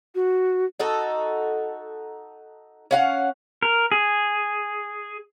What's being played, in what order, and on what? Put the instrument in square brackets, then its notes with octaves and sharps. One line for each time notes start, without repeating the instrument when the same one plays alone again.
[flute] F#4
[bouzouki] D#4 F#4 A4
C#4 F5 F#5
[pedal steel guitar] A#4
G#4